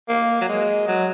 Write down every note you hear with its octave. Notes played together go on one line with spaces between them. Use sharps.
A#3
F#3
G#3
F#3